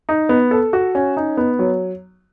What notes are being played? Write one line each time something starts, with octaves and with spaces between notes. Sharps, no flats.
D#4
B3
A4
F#4
C#4
D#4
B3
F#3